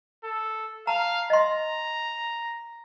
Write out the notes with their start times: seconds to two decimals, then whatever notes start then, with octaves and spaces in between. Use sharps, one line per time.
0.24 A4
0.87 F5 A5 A#5
1.30 D#5 A#5 C6